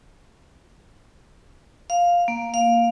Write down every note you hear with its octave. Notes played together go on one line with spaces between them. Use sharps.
F5
A#3
F5